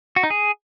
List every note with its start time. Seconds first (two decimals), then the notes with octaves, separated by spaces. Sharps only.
0.16 F#4
0.23 D#4
0.30 G#4